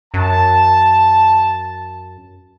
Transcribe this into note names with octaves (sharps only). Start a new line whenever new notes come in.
F#2 A5